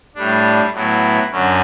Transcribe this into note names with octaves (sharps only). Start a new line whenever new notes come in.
A2 G3 D4
A2 F#3 B3 E4
F#2 D3 F#3 C#4